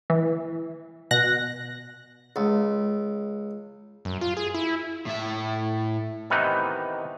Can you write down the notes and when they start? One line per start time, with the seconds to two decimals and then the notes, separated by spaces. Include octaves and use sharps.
0.10 E3
1.11 B2 F#6 A#6
2.36 C#2
4.05 F#2
4.21 F4
4.37 G#4
4.55 E4
5.06 A2 E5
6.30 C3 D#3 E3 B3 D#4